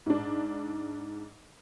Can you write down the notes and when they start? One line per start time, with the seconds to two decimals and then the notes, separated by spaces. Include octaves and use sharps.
0.06 G#2 D4